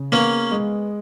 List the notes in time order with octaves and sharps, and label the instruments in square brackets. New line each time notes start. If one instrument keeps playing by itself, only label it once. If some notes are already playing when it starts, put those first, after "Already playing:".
Already playing: [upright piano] C#3
[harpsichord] A#3 C#4 [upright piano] B3
[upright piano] G#3